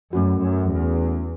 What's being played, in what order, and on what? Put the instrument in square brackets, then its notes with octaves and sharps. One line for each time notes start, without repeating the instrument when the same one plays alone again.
[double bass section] F#2 [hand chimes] A3 C#4 F#4
[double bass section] F#2
E2